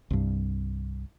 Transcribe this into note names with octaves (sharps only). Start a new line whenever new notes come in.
C2 G2